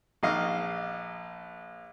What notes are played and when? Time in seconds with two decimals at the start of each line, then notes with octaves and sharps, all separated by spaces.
0.23 A#1 D#4 D#5 F5